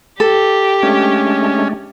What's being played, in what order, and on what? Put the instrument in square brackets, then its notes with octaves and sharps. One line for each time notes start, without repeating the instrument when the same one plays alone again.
[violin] G4 [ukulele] A4
[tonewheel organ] G#3 A3 D4 [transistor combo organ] C#4